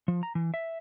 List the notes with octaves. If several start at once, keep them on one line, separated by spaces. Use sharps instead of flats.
F3
A#5
E3
E5